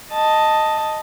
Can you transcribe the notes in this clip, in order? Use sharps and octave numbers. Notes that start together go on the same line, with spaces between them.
D#5 A5